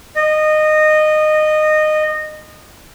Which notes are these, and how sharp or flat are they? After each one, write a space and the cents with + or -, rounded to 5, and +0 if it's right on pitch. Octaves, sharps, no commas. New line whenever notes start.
D#5 -20